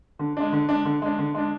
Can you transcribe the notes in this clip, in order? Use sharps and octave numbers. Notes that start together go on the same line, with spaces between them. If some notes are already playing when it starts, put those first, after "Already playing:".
D3
G#3 D4
D3
G#3 D4
D3
G#3 D4
D3
G#3 D4